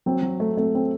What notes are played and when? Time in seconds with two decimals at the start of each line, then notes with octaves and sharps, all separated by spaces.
0.06 F#3 C4
0.23 F#3
0.40 A3
0.57 A3 C4
0.75 C4